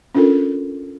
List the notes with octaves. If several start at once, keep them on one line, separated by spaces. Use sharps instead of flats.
C#4 D4 F4 A4 A#4